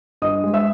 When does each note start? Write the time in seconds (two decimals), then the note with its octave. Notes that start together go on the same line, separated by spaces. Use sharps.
0.22 G2 D#5 D#6
0.44 G#3
0.54 E5 E6